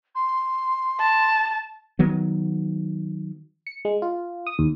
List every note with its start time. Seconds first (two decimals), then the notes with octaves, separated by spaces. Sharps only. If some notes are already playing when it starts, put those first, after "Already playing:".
0.15 C6
1.00 A5
1.99 D#3 F#3 B3
3.67 C#7
3.85 G#3
4.02 F4
4.47 D#6
4.59 D#2